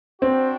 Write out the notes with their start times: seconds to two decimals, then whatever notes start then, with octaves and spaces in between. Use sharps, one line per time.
0.21 C4 D4 F#4 C5 G5